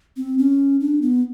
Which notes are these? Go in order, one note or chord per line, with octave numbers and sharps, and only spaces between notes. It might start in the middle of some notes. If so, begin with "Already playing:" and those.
C4
C#4
D4
B3